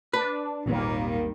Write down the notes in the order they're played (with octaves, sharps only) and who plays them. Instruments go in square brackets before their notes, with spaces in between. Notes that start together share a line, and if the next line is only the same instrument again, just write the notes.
[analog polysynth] D4 [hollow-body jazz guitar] B4
[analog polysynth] G#1 D#2 A#3 [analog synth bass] A#2 [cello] D#3 G3